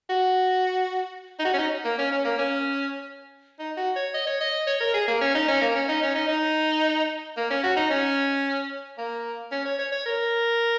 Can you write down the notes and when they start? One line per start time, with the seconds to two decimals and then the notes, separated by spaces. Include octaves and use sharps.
0.10 F#4
1.39 D#4
1.45 F#4
1.54 C#4
1.58 D#4
1.84 A#3
1.98 C#4
2.12 C#4
2.25 A#3
2.39 C#4
3.59 D#4
3.77 F#4
3.96 C#5
4.14 D#5
4.27 C#5
4.40 D#5
4.67 C#5
4.80 A#4
4.94 G#4
5.08 A#3
5.21 C#4
5.35 D#4
5.48 C#4
5.61 A#3
5.76 C#4
5.88 D#4
6.02 C#4
6.15 D#4
6.28 D#4
7.37 A#3
7.50 C#4
7.63 F#4
7.76 D#4
7.90 C#4
8.98 A#3
9.52 C#4
9.65 C#5
9.79 C#5
9.92 C#5
10.06 A#4